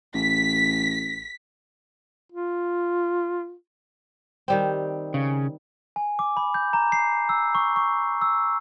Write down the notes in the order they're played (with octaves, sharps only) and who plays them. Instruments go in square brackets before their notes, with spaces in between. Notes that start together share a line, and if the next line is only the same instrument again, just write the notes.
[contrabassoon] A1 [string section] B6
[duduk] F4
[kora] D#3 G3 C4
[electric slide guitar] C#3
[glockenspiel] G#5
D6
B5
G6
A#5
C7
E6
C#6
C#6
E6